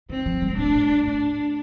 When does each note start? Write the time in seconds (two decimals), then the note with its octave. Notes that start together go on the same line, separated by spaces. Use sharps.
0.09 D#3 C4
0.26 F3
0.42 G3
0.53 A#2
0.58 A2 D4
0.75 A2
0.91 G2
1.07 A2 D4